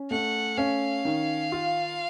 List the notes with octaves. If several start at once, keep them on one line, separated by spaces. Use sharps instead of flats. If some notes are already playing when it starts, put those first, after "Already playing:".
Already playing: C#4
A3 F#5
C#4 F5
D#3
F4